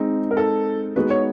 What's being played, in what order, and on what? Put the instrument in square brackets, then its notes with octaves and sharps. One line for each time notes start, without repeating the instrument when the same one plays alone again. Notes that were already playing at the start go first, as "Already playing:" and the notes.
Already playing: [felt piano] G#3 C4 D#4
[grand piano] A#4
A4
[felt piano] G#3 B3 D#4 F#4 [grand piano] B4
[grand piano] C#5